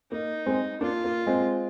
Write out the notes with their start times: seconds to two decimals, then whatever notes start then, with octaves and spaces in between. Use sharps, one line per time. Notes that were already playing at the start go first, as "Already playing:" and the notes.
0.11 A#3 D#4
0.46 G#3 C4
0.80 A#3 D4 F4
1.04 A#3
1.27 G#3 C4